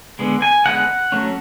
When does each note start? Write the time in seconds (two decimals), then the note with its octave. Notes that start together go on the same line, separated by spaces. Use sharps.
0.19 D3 G#3 B3
0.42 G#5
0.65 D3 G#3 B3 F#5
1.12 F#3 A3 C#4